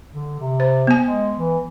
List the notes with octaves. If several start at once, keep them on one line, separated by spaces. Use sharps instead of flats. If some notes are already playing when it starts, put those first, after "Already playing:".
D3
C3
C5
B3 G#5
G#3
E3